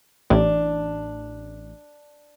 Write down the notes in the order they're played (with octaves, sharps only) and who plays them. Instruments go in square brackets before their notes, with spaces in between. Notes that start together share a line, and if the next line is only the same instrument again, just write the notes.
[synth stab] A1 [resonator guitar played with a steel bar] D4